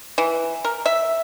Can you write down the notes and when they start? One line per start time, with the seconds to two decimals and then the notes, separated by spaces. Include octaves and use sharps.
0.18 E3
0.64 A#4
0.86 E5